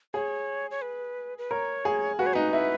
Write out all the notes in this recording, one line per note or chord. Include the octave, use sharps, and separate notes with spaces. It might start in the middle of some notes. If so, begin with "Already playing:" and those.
G#4 C#5
C#5
B4
B4
A#4 C#5
G#4
F#4 B4
C#5
D#4 B4
E4